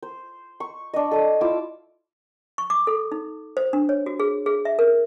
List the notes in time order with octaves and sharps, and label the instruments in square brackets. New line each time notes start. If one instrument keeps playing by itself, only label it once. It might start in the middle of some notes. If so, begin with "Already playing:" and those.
[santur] C5
C#6
D4 D#5
A4 D#6
E4 F4 D6 E6
[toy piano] C#6
D6
A4
D#4
C5
D4
C#5
F#4
G#4
G#4
E5
A#4